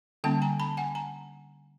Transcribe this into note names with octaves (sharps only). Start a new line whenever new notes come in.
D3 G3 A#3 C#4 G5 A5
G#5 A#5
A5 B5
F#5 G#5
G#5 A#5